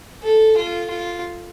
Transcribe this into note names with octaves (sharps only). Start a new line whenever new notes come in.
A4
F4
F4